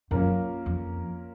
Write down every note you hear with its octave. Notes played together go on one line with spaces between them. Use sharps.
F#2 A#3 C#4 F4 A#4
F2